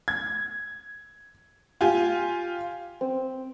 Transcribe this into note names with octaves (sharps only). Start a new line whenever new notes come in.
G#6
F4 G4 G#5
C4